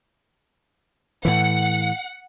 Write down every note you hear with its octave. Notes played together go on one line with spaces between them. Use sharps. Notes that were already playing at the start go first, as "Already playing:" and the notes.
A2 E3 F#5